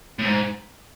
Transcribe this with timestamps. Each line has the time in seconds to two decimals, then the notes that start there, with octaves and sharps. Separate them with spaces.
0.19 A2
0.25 G#2